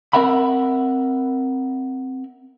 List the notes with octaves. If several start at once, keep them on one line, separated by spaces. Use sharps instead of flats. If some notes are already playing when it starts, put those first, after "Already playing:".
C4 A#4 E5 F#5 B5